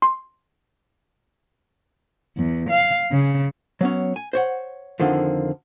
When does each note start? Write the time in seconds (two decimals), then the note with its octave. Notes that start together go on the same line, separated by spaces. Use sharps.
0.02 C6
2.37 E2
2.70 F5
3.13 C#3
3.81 F#3 B3 C#4
4.16 G#5
4.33 C5 C#5 F#5
5.00 F2 D3 D#3 F3